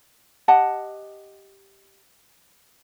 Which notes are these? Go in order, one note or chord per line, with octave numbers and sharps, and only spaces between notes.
G4 D#5 F#5 A5